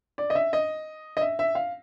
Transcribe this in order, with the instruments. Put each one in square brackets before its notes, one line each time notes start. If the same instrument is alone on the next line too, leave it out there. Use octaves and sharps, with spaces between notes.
[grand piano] D5
D#5
E5
D#5
D#5
E5
E5
F5